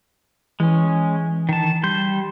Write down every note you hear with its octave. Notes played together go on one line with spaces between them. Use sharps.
E3 G#3 C#4
D#3 A5
G3 C6 G6